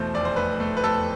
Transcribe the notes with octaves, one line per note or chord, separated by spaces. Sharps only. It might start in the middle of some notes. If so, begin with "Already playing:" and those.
Already playing: E2 B2 A3 C5
F1 D5
C5
A3 B4
A3
B4
F1 A4